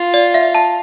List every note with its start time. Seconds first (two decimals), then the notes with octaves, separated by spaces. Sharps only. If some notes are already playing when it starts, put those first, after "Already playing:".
Already playing: F4
0.14 D5
0.34 E5
0.55 A5